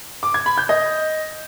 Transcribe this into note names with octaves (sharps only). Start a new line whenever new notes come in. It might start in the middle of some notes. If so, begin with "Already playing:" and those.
D6
G#6
B5
G6
D#5